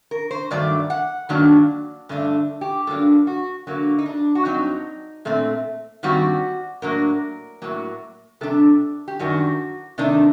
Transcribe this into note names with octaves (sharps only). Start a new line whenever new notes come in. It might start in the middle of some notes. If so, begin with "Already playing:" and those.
A#4
C5
G2 D#3 F#3 A3 D5
F#5
G2 D#3 F#3 A#3 D4
G2 D3 A3 D4
G4
G2 F#3 A#3 D4 A4
F#4
D3 F#3 A#3
D#4
D4
F#4
G2 F#3 C4 D#4
A#2 A3 C4
G2 D#3 G3 C4 F#4
A2 F#3 A#3 D4 A#4
A2 F#3 A#3
C3 G3 D4 A4
G4
F#2 D#3 G3 D4 F#4
C3 D#3 A3 D4 D#4